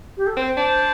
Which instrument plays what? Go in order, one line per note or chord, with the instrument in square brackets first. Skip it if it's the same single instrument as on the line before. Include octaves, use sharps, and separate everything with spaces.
[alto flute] G4
A4
[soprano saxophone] C4 [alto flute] C5
[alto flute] C5
[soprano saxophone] D4